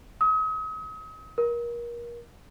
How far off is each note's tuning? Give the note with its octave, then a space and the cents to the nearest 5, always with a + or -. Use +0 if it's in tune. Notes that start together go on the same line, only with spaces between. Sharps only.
D#6 +40
A#4 +30